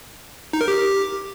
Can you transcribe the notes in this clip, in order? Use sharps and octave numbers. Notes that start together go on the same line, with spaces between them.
D#4
A#4
G4